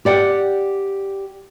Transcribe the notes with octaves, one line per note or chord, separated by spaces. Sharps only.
G4 D5 F#5 G5